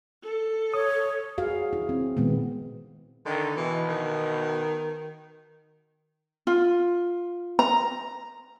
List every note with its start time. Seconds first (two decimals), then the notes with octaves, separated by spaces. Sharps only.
0.23 A4
0.74 C#5 D#6
1.38 F#4 G#4 F5
1.73 E4
1.89 C4
2.17 A#2 D#3 G#3 B3
3.26 D3 D#3
3.56 B2 E3
3.89 D#3
6.47 F4
7.59 A#5